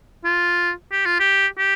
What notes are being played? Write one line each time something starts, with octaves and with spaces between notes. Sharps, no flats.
F4
G4
F4
G4
G4